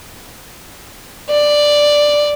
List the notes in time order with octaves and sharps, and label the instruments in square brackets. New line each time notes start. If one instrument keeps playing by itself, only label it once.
[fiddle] D5